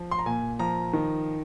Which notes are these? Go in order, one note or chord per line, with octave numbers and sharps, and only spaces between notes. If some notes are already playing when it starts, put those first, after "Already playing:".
Already playing: F3
C6
A#5
A#2 G#5
F3 A#5
D#3